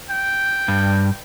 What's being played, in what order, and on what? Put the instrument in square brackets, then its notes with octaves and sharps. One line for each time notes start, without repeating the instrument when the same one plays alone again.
[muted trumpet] G5
[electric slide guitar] G2